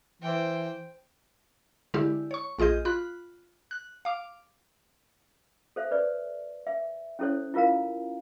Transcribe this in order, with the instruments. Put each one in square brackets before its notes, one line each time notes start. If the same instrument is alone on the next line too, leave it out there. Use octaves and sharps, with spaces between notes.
[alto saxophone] E3 [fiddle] C5 G5
[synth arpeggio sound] D3 G#3 E4 G4
C#5 C#6
A#1 F4 G#4 D#5 G6
F4 B5 F#6
F#6
F5 D6
[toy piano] A4 C5 E5
B4 D5
E5
C#4 E4 A4 C5 C#5
E4 F4 A#4 F5 A#5